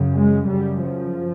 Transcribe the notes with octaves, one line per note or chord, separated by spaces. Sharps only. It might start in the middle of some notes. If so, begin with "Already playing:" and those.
Already playing: F#2 C#3
G#3
F#2 C#3 G3
F3